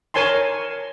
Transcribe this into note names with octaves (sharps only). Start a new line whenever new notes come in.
A#4 C#5 G#5 A5 C6